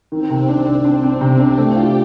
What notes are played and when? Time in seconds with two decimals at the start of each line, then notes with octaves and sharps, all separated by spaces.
0.12 D#3 C4
0.30 C3
0.48 D4
0.66 D4
0.84 D4
1.03 D4
1.21 C3
1.40 D4
1.58 A3 G4
1.76 F4